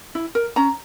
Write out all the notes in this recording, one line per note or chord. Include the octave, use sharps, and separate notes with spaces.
E4
A#4
C#4 A#5